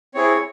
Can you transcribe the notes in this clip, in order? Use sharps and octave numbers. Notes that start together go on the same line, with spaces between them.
C4 E4 G#4 C#5